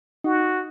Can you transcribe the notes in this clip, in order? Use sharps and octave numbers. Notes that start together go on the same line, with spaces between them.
D#4 F#4